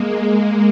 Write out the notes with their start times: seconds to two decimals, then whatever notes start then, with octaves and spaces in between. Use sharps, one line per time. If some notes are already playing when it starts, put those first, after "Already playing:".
Already playing: G#3 A#3